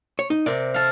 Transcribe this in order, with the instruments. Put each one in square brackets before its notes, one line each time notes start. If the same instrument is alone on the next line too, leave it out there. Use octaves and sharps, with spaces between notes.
[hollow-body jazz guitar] C#5
D#4
[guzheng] C3 [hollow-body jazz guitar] A#4 D5
[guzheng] A4 F5